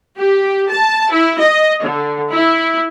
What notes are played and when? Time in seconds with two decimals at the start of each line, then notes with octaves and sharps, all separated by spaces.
0.18 G4
0.70 A5
1.10 E4
1.39 D#5
1.82 D3
2.32 E4